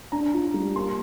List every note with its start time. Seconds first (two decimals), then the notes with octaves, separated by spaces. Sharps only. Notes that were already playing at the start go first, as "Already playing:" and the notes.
0.12 D4 A#5
0.34 F4
0.54 G3
0.76 A#3 C6